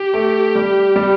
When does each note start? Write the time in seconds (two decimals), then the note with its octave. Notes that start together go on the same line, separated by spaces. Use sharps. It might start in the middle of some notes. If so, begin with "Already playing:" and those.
Already playing: G4
0.14 A3
0.55 G3
0.96 G3